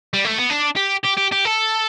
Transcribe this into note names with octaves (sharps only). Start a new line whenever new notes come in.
G3
A3
B3
D4
G4
G4
G4
G4
A4